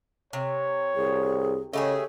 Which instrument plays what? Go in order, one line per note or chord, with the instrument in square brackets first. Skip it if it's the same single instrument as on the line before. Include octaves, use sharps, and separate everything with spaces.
[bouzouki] C3 [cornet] C#5
[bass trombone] C2 [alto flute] G#4
[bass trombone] C#3 [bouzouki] A3 G4 G#4 [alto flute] C#5 [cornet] D#5